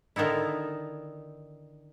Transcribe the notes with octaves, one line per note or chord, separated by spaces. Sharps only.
D3 D#3 B3 D#4 E4